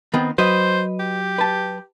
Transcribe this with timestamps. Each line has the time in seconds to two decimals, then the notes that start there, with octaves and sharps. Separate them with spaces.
0.14 D#3 B3 C4
0.38 F#3 B4 C5 D#5
1.00 G4
1.38 B4 A5